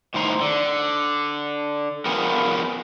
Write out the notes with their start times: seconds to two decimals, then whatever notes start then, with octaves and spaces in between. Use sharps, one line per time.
0.14 A2 D#3 C5 A#5
0.41 D3
2.06 F3 B3 G#4 A#4 G5